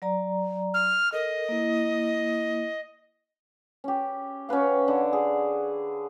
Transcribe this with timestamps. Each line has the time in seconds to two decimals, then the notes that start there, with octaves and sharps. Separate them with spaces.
0.02 F#3 D5 A#5
0.74 F6
1.12 A4 A#4 D#5
1.49 A#3 E4
3.84 C#4 G4
4.49 C#4 F#4 B4 F5
4.88 D3
5.13 G#4